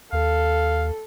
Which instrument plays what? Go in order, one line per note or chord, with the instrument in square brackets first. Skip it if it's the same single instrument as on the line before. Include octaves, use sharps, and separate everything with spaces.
[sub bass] D#2 [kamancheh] A4 [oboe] F5